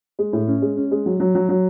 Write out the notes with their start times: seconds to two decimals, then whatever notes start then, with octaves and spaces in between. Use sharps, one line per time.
0.19 G#3
0.33 A2
0.47 C#4
0.62 G#3
0.76 C#4
0.91 G#3
1.06 F#3
1.20 F#3
1.35 F#3
1.49 F#3